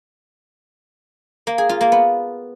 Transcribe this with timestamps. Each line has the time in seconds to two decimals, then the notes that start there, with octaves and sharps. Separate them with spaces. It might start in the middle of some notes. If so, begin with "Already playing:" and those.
1.47 A#3
1.58 G#4
1.69 F4
1.81 A#3
1.92 B3